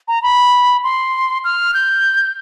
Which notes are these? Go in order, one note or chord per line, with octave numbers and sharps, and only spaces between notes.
A#5
B5
C6
F6
G6